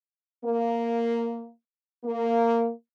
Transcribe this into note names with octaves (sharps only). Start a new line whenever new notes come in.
A#3
A#3